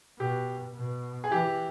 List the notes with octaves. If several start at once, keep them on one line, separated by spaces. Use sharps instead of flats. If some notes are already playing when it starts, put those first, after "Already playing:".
B2 G4
B2
G#4
E3 G4